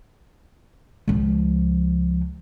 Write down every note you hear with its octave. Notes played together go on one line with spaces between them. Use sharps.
C#2 F3